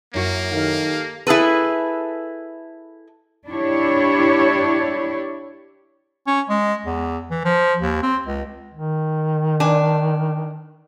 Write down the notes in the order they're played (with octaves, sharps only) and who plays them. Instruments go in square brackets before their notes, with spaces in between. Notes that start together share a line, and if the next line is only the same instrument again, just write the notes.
[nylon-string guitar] F#2 E4 F#4 [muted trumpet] A#3
[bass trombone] D#3 [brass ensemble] G4 A4 F5
[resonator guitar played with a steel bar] E4 G#4 A4 B4
[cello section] D4 E4 G4 C#5
[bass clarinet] C#4
G#3
E2
E3
F3
D#2
C4
C#2
[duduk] D#3
[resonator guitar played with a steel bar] D4 B4 G#5